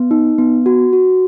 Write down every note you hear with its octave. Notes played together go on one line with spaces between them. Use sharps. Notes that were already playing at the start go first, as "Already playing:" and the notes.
Already playing: B3
D#4
B3
F#4
F#4